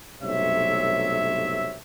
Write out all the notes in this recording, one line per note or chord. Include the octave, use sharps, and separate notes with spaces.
B1 G2 C3 A3 C#5 E5